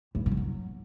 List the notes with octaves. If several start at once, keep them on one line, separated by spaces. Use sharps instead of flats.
A2
E2
A2
D#3
F#3